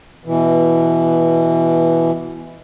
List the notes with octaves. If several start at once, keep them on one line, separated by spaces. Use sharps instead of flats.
B2 E3